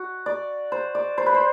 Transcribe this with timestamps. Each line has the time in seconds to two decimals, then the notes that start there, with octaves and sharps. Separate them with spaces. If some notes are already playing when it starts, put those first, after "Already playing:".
Already playing: F#4
0.26 D5
0.72 C5
0.95 D5
1.18 C5
1.26 B4
1.34 C5